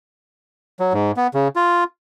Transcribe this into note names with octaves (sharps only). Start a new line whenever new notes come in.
F#3
G#2
B3
C#3
F4